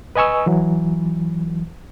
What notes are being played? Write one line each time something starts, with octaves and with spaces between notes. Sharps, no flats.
B4 D#5 G#5 C#6 E6
E3 F#3